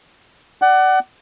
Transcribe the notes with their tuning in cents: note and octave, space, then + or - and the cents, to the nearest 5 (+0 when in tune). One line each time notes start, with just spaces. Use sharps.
D5 +15 F#5 +25